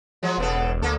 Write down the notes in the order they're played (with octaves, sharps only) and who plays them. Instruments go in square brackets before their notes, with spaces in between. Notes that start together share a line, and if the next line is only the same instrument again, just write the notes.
[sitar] F3 F#3 G#3
[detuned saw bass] E1 [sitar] C#3 B3 A4
[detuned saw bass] D2 [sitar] A#3 A4